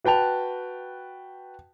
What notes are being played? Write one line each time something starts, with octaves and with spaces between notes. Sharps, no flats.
F#4 B4 G5 A5 F7